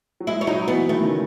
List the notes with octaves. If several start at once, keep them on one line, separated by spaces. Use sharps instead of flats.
F#3
G#3 E4
C#4
F#3 D#4
E3 B3
D#3 A3
C#3